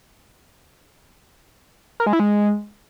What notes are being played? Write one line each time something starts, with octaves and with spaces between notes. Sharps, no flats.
A#4
G#3
E4
G#3